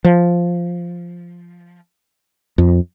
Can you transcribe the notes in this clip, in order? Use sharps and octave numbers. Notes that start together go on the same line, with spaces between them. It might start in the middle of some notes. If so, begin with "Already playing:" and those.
F3
F2